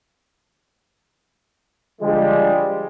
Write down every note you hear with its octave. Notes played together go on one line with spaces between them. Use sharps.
D3 F3 G3 G#3